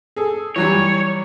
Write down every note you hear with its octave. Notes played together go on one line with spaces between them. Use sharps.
G#4 A4
E3 F#3 G3 C#5